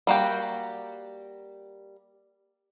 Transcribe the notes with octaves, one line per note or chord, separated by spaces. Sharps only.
G3 A#3 F#4 G4